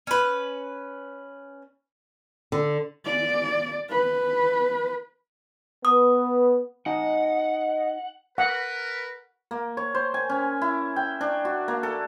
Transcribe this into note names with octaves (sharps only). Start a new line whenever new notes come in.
C#4 B4
D3
D5
B4
B3 B4 D#6
D#4 F#4 D#5 F#5 G#5
A#4 B4 F#5
A#3
C#5
C5
G#5
C#4
E4
G5
D4
F#4
A#3
A4